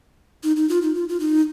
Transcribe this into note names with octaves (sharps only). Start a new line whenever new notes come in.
D#4
D#4
F4
D#4
F4
F4
D#4